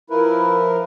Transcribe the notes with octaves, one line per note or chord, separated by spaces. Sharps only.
F3 E4 A#4 B4